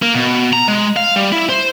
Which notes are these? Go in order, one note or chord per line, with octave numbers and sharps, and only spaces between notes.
A#3
B2
A#5
G#3
F5
G3
E4
C5